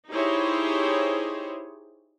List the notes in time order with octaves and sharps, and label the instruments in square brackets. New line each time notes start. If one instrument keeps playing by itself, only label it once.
[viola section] D#4 E4 G4 G#4 C5 C#5